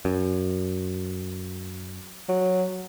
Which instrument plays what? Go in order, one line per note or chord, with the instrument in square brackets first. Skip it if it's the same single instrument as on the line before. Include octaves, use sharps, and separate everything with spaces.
[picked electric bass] F#2
[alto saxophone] F#3